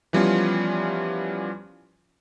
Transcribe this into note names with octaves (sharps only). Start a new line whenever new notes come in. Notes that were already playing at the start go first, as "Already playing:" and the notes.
E3 F3 G3 B3 C#4 F4